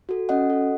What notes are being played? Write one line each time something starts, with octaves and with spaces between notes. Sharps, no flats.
F#4 A4
C#4 D#5 F#5
F#4 A4